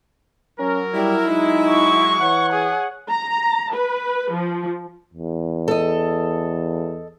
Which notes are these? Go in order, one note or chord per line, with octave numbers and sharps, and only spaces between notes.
F#3 C#4 A#4
G3 E4
F#3 G#3 D#4
C#6
E3 C#5 F#5
G#4
A#5
B4
F3
E2
A4 D#5